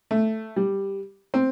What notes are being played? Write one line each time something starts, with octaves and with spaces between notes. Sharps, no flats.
A3
G3
C4